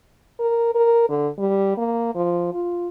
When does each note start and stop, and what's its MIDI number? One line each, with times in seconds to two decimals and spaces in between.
0.39 0.70 70
0.75 1.06 70
1.09 1.28 50
1.39 1.77 55
1.77 2.14 58
2.15 2.51 53
2.54 2.88 65